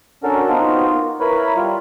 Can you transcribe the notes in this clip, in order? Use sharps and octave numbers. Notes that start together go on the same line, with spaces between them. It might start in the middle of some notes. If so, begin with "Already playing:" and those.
C#4 D4 F#4 A4 A#4
B3 C4 D#4 F4 F#4
A#3
E4 A#4 B4 C#5 B5
G3 F4